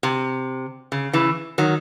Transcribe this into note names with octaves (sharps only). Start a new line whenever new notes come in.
C3
C#3
C#3 E3
D#3 F#3